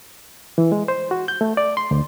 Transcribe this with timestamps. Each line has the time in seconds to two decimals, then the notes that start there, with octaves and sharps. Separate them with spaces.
0.58 E3
0.72 G#3
0.88 C5
1.11 F#4
1.28 G6
1.41 A3
1.57 D5
1.77 C6
1.91 D2